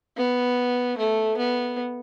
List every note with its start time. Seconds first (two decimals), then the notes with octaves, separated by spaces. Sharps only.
0.17 B3
0.97 A3
1.37 B3